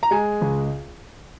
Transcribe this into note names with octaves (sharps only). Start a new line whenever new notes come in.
A#5
G#3 G#5
C#2